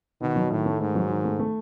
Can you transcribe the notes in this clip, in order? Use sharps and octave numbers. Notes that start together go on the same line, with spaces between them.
B2 D#3
F#3
A2 D#3
A3
G#2 D#3
F#3
D#3
A3
A3